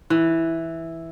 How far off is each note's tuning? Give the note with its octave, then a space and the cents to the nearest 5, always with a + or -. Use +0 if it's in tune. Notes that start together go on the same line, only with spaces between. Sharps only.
E3 -5